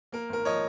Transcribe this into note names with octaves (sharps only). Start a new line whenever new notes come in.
A#3 A#4
G#1 A#4
F3 C#5 D#5